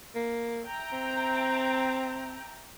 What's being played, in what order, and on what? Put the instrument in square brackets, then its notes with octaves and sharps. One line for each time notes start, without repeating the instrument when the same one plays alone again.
[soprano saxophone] A#3
[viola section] E5 G5 A#5
[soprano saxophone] C4